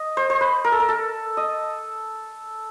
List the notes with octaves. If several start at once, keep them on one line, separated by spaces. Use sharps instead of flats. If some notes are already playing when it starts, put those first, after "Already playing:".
Already playing: D#5
C5
C5
B4
A#4
A4
A#4
A4
D#5